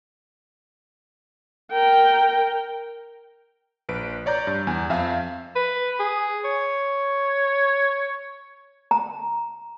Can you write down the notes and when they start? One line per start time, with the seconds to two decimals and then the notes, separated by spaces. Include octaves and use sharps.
1.72 A#4 G5
3.89 A#1 B4 D7
4.26 C#5 D5 A#5 G6
4.47 G2
4.67 E2 G#5
4.90 F2 E5 F5
5.56 B4
6.00 G#4
6.45 C#5
8.91 A#5